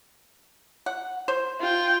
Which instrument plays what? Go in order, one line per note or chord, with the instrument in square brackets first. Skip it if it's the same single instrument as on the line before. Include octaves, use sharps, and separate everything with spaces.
[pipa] F#5
C5
[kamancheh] F4 G5